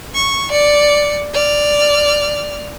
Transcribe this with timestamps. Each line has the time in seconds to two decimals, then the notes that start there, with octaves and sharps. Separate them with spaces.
0.15 C#6
0.52 D5 C#7
1.34 D5 F6